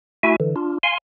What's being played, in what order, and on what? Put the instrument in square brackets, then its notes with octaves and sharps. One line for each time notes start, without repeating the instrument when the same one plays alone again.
[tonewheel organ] A3 E4 F#4 E5 G#5
D3 E3
D4 F4
F5 G#5 C6